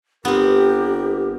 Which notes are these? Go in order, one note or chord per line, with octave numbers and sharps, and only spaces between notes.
G1 B3 C4 G4 A#4